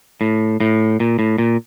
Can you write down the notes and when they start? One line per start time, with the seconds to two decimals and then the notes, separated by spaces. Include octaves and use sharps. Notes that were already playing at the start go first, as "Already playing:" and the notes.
0.21 A2
0.60 A2
1.00 A#2
1.19 A2
1.38 A#2